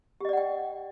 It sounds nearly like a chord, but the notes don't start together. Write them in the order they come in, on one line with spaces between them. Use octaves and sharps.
G4 D#5 D5 F#5 G5